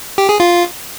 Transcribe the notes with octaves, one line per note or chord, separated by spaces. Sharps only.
G4
G#4
F4